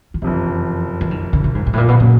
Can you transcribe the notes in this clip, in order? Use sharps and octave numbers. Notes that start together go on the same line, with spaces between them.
D#3
F#1 F2 C3 E3
E3
D#3
C#3
C#3
G#2
G#2
A2
A#2
B2
A#2 C#3 F#3 A#3